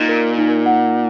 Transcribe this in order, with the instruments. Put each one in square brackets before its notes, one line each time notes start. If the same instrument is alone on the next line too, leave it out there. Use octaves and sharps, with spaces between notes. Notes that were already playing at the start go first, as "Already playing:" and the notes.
Already playing: [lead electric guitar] A#2 [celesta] D#4 D#5
[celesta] A#4
D#4
F#5